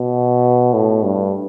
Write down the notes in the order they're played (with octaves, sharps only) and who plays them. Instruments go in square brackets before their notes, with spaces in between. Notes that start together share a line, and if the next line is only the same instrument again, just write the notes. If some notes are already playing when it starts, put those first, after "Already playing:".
Already playing: [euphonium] B2
A2
G2